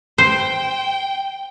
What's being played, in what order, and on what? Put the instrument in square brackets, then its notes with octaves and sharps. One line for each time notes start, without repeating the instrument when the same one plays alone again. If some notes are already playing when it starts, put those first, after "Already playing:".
[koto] C5 [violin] G5